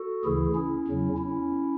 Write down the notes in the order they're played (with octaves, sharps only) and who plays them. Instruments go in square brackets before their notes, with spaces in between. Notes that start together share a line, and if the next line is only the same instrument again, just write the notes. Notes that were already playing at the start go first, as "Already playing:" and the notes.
Already playing: [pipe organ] F#4 A4
D2 C#3 E3 E4 G#4
C#4 E4
E2 C#3 F#3
C#4 E4